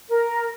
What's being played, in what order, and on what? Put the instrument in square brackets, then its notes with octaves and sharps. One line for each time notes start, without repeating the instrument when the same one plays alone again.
[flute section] A#4